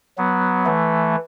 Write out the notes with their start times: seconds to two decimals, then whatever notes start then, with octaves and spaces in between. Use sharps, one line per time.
0.18 F#3 B3
0.66 E3 A3